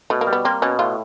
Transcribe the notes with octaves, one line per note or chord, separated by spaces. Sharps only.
B2 A3
A#3
G3
B3
A#3 C4
B2 C#4
A2 F4